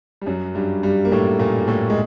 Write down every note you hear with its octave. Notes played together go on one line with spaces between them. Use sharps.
G3
F#2 F#3
G2 G3
G2 G3
A#3
A2 A3
A#2 A#3
A2 A3
G#3